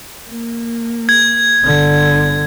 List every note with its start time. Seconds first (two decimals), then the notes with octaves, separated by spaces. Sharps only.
0.29 A#3
1.09 G#6
1.63 G1 D3